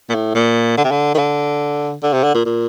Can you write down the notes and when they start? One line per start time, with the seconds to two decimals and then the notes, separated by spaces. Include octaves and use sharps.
0.10 A#2
0.15 A2
0.35 A#2
0.77 D3
0.84 C3
0.91 D3
1.15 D#3
1.18 D3
2.03 D3
2.13 C3
2.24 D3
2.34 A#2
2.45 A#2